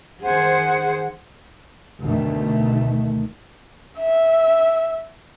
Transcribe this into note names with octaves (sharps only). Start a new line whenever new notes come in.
D#3 G#4 C5 F#5
D2 B2 D#3 A3
E5